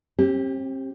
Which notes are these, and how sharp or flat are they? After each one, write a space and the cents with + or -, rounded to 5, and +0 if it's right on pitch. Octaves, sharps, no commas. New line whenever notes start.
C4 +40 G4 +0